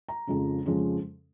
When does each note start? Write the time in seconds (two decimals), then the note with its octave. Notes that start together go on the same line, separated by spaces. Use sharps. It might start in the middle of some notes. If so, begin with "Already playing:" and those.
0.08 A#5
0.27 F2 C#3 F3 G#3 C#4
0.66 F2 C#3 F3 G#3 C#4